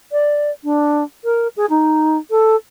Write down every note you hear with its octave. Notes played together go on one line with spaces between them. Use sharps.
D5
D4
A#4
G#4
D#4
A4